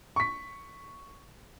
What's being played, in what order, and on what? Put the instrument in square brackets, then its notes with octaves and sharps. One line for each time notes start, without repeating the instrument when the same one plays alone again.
[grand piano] C#6 B6